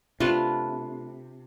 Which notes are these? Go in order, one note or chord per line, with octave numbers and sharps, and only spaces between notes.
C3 A3 D4 F4 B4